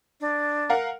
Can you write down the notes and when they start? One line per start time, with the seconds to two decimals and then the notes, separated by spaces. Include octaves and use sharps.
0.21 D4
0.70 A#4 F5 F#5